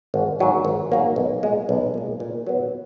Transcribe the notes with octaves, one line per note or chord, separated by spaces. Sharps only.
G#1
G#2 F#3 A#3
G#1
G#2 F#3 A#3
B1
A#2 G#3
B1
A#2 G#3
A#2
F#3 B3